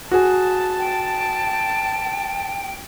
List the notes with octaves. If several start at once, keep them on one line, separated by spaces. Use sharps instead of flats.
F#4 G#4 A5
G5